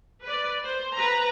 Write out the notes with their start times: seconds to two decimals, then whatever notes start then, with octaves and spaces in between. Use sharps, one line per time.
0.23 B4 D5
0.63 C5
0.94 B4 A#5